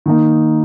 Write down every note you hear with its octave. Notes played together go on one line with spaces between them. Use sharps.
D#3 A#3 D#4